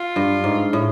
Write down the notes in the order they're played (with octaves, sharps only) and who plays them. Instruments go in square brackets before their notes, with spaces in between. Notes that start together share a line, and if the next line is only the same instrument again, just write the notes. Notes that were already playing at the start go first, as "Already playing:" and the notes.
Already playing: [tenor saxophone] F4
[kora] G2
G#2
A2